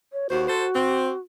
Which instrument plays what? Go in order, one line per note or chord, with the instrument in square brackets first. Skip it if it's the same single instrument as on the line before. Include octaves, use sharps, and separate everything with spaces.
[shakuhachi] C#5
[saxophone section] D#2 C5 [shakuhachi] F#4
[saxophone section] A4 C5
C4